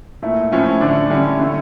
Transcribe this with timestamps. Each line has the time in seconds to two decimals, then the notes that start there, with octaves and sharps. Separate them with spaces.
0.22 A#2 A3 E4
0.52 A2 F3 C#4 E4
0.81 D3 A3 D4
1.10 D3 G3 C#4 E4
1.40 D3 A3 E4